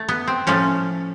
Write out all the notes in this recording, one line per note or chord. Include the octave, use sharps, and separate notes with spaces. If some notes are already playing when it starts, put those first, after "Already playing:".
Already playing: A3
B3
C4
A2 F3 A3 C#4